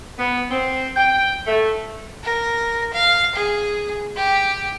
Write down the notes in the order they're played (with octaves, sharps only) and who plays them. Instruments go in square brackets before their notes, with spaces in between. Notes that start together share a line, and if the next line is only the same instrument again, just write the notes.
[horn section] B3
C4
G5
A3
[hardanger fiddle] A#4
F5
G#4
G4